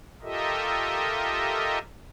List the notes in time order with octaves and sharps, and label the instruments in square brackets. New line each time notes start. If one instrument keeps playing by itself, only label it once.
[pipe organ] F4 G4 A4 A#4 D#5 E5